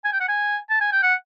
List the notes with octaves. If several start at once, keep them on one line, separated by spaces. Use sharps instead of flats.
G#5
G5
F#5
G#5
A5
G#5
G5
F#5